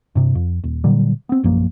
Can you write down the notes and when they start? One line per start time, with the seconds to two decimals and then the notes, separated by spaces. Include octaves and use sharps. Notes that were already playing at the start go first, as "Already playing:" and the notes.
0.15 G2 C3
0.35 F2
0.64 D#1
0.84 A#2 D3 F#3 G3
1.29 B3 C4
1.43 A#1 F#2 F3 A#3